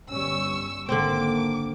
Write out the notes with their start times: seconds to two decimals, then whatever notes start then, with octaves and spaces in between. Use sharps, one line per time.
0.10 G1 G3 C#4 C#6 E6
0.89 G#1 D3 A#3 C4 D6